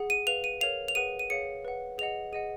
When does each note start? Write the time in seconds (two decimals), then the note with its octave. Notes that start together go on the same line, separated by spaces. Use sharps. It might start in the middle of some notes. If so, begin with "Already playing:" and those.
Already playing: G#4 F#5
0.10 D#7
0.27 B4 F5 F7
0.44 D#7
0.61 A#4 C#5 F5 F7
0.88 F7
0.95 G#4 B4 F#5 D#7
1.19 D#7
1.30 G#4 C#5 F5 C#7
1.65 B4 F#5
1.98 G#4 D#5 F#5 F7
2.32 G#4 D#5 F#5 D#7